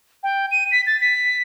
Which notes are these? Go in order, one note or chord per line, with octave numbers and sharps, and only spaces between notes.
G5
D#7
B6
A6
B6